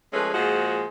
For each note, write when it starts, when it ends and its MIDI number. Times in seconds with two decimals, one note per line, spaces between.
0.13 0.33 53
0.13 0.33 56
0.13 0.33 57
0.13 0.33 61
0.13 0.33 68
0.13 0.33 71
0.34 0.87 46
0.34 0.87 53
0.34 0.87 56
0.34 0.87 66
0.34 0.87 68
0.34 0.87 72